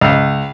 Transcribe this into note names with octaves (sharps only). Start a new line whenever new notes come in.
C#2